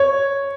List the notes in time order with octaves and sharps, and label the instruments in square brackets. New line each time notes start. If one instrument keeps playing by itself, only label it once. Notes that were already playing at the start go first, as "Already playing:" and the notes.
Already playing: [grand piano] C#5